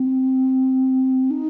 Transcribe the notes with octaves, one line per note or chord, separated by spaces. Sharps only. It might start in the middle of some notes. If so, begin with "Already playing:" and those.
Already playing: C4
D#4